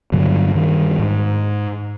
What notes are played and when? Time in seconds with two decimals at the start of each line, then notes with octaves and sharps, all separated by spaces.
0.12 G2 D3 F#3
0.54 G2 D#3
0.99 G#2